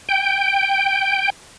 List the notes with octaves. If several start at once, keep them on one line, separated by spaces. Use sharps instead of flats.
G5